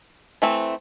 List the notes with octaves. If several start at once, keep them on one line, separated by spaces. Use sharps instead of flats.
E3 A3 C4